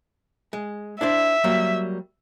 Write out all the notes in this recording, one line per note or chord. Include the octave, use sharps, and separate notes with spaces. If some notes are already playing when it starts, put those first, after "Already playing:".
G#3
D4 E4 C5 E5
F#3 G3 A#3